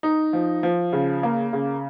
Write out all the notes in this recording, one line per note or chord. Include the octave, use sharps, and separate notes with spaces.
D#4
F3
F3
C#3
A#3
C#3